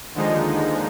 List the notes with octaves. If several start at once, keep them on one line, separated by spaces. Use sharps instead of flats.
D#2 D3 F3 G#3 D#4